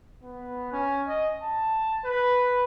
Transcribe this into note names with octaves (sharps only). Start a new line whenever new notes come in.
B3
C#4
D#5
A5
B4